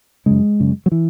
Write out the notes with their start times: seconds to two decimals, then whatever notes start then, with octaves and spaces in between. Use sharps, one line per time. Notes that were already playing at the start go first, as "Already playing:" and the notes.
0.26 F#2 C#3 G#3
0.60 F#2 C#3
0.86 F#3
0.92 E3